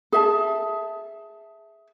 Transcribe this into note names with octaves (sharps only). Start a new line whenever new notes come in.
G#4 E5 A5